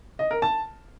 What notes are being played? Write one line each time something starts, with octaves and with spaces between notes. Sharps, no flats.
D#5
A#4
A5